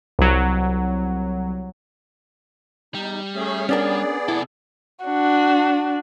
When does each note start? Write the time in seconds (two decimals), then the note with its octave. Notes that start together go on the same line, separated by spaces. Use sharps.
0.19 C2 F#3
2.94 E2 G3 D#4
3.35 A3 C#4 G#4
3.69 B3 C#4 D4 G#4 A#4 D5
4.28 C3 E4 A4
5.05 D4 F#4